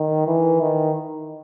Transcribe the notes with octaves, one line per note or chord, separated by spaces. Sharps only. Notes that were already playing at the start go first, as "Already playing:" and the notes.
Already playing: D#3
E3
D#3